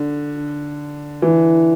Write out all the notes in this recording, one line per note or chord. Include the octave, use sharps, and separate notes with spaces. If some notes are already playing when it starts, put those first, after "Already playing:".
Already playing: D3
E3